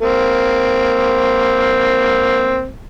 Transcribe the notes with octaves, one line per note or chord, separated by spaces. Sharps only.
A#3 C4